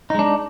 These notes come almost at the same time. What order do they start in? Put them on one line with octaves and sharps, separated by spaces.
D#4 G#3 D4